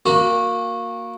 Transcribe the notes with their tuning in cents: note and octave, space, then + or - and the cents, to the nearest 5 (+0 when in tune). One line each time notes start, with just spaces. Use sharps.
A#3 +0 F#4 -20 B5 +25